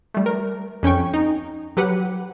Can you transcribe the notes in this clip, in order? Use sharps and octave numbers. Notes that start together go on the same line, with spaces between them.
G3 A3
A#4
F2 C#4 G5 C#6
D#4
F#3 G4 B4 F#5